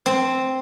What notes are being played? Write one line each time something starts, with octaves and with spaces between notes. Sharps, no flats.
C4